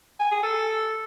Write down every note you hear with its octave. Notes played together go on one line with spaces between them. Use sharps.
G#5
G#4
A4